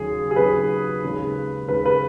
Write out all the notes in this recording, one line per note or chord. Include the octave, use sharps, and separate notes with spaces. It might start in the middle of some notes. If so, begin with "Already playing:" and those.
Already playing: D#2 C#3 F#3 G#4
G#4
D#2 C#3 F#3 B4
D#2 C#3 G#3
D#2 C#3 G#3 B4
B4